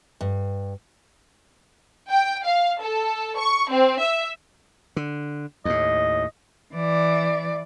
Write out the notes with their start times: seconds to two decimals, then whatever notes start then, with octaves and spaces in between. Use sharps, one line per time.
0.21 G2
2.10 G5
2.45 F5
2.82 A4
3.38 C#6
3.71 C4
4.02 E5
4.96 D3
5.65 D#2 A2 D#5
6.74 E3 D5